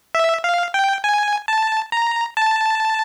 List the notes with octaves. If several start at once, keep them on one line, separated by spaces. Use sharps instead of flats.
E5
F5
G5
G#5
A5
A#5
A5